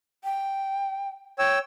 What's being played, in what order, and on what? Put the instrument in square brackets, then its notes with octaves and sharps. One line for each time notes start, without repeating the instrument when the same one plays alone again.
[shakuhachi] G5
[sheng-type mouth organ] C#5 G5 E6